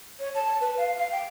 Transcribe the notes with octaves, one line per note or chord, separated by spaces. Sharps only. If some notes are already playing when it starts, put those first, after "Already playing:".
C#5
A5
B4
F5
F5
G5